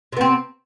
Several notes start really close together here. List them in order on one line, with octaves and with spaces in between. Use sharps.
C3 B3 C4